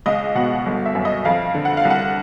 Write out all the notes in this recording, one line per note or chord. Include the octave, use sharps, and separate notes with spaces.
C#2 D#5
B2 F#5
G1
E5
F#2
D#5
F2 F5
D3
F#5
F5
C2
F#5